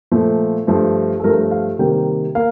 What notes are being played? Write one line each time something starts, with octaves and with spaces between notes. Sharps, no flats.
A#2 F3 A3
G2 F3 A3
A4
G2 F3 A3 A#4
F5
C3 D#3 G3 A#3 G5
A#3 F5